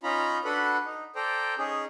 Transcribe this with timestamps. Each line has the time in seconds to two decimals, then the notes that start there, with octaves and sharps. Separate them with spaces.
0.03 C#4 D#4 F4 A#5 B5
0.45 D4 F#4 A4 B4 F#5 B5
0.85 D#4
1.15 A4 C5 D5 G5 A#5
1.58 C#4 D#4 G#4